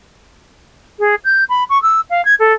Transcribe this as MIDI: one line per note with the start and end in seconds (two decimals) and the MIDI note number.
0.99 1.15 68
1.25 1.44 91
1.49 1.64 83
1.70 1.81 85
1.82 2.01 88
2.10 2.24 77
2.25 2.35 92
2.39 2.53 69